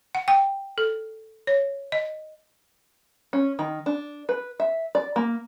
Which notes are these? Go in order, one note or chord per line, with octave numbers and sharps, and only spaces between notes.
F#5
G5
A4
C#5
D#5
C#4
D#3
D4
B4
E5
D5
A#3